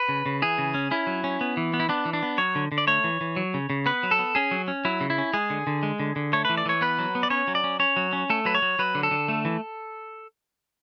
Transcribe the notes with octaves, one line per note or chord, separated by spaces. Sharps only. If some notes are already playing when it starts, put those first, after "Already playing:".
Already playing: B4
C#3
C#3
E3 G#4
C#3
C#4
C#4 E4
F#3
C#4
B3
E3
B3
E4
B3 D4
E3
D4
B3
F#3 C#5
D3
D3
D5
A3 C#5
E3
E3
F#3
C#3
C#3
B3 B4
F#3
A4
B3
C#4 G#4
F#3
C#4
F#3 E4
C#3
E4
C#4
G#3 G#4
D3
D3
G#3
D3
D3
A3 C#5
E3 B4
D5
E3 C#5
B3 B4
F#3
B3
D5
C#4 C#5
F#3
D5
C#4
C#4 C#5
F#3
C#4
A3 A4
F#3 B4
C#5
F#3
F#3 B4
D3
A4
D3
A3
E3